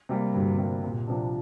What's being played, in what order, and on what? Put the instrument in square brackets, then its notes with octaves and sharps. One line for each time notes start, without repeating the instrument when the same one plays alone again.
[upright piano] C3 G3 A#3
[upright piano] D2 [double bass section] G2
[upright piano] C3 G3 A#3
[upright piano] C2 [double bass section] A#2
[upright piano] C3 F3 D4